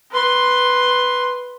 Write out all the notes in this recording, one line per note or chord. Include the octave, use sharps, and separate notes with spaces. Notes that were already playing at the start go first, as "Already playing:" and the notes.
B4 C6